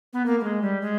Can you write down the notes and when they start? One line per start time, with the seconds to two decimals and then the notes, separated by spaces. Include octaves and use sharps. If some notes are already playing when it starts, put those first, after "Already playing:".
0.13 B3
0.26 A#3
0.40 A#3
0.43 G#3
0.62 G3
0.81 G#3